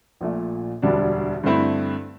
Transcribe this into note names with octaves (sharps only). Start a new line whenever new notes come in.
A#1 A#2 A3
E1 D2 D3 G3 D4
G2 D3 A3 C4 E4